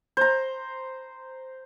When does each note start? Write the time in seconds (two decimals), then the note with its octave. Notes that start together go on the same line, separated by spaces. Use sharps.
0.17 C5 A#5